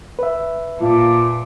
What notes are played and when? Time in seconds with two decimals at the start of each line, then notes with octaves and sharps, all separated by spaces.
0.19 B4 E5
0.81 A#2 F4 A5 D6